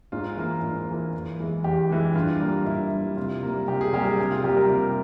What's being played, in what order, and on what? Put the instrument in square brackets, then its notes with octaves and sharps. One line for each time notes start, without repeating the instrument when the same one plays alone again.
[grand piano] G#2 F4
E3 A#3
G#2
E3 A#3
E2
E3 G#3
E2 G4
E3 G#3
G2 F4
G3 A#3
G2 E4
G3 A#3
C3 F4
G3 A#3
C3 G4
G#4
G3 A#3 G4
G#4
C3
F4
G3 A#3 G4
A#4
C3